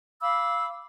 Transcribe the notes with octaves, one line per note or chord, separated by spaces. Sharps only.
F5 B5 D6 E6